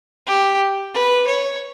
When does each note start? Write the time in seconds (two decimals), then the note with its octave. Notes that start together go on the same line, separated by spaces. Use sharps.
0.26 G4
0.94 B4
1.27 C#5